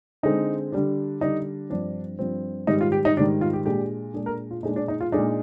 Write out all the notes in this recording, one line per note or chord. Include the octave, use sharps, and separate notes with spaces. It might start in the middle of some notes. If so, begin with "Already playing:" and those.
D3 G#3 C4 D#4
D3 G3 D4
D3 G3 D4 D#4
G2 F3 C4 D4
G2 F3 C4
G#2 D#3 G3 D#4
F4
G4
D#4
G#2 D#3 G3 D4
F4
G4
A#2 G#3 D4 G4
A#2 G#3 D4 G#4
A#4
F4
A#2 G#3 D4 D#4
D4
D#4
F4
A#2 G#3 D4 D#4